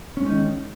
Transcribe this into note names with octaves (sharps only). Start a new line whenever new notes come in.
D#3 G#3 C#4 D#4